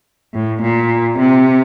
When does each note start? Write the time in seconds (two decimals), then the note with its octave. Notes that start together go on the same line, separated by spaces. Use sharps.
0.34 A2
0.62 A#2
1.18 C3